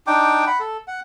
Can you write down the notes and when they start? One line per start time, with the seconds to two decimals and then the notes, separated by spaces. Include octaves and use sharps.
0.07 D4 D#4 G5 D6
0.47 F#5 B5
0.60 A4
0.88 F#5